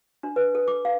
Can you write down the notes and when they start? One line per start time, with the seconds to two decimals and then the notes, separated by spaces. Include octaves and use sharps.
0.23 D4
0.36 B4
0.55 A4
0.68 D6
0.85 F5